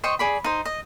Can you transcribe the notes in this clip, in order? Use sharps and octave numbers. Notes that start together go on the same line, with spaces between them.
C5 D#5 G5 C#6
G#4 D5 B5
D#4 C5
D#5